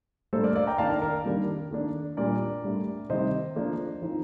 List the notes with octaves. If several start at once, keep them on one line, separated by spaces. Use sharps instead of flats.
A2 G3 A#3 D4 A4 C5
A#4 D5
D5 F5
G5 A#5
D#3 A#3 D4 F5 A5
A#4 D5
A#4
D#3 G3 A#3 D4
D#3 A#3 D4
A#2 G3 D4 A#4 D5
A2 G3 D4
C3 D#3 G3 C4 C5 D#5
F3 A#3 D4
F3 C4 D#4